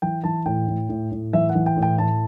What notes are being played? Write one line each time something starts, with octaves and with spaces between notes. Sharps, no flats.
E3 G5
E3 A5
A2 G5
A2
A2
A2
E3 E5
F#5
E3
G5
A2
G5
A2 A5